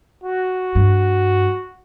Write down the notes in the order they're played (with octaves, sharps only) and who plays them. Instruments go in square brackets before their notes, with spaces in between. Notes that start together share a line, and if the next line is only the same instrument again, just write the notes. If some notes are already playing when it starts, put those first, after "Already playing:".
[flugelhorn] F#4
[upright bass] G2